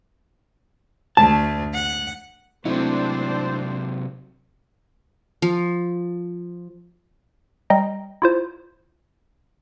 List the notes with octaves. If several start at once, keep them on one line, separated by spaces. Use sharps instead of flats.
D2 A3 A5
F#5
C3 F#3 A3 C4 D4 E4 C5
F3
G3 D#5 G5 A#5 A#6
E4 F4 C5